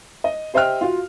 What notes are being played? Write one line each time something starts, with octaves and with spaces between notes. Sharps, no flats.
D#5
G4 C5 D#5 E5 G5 F6
F4 F#4 F5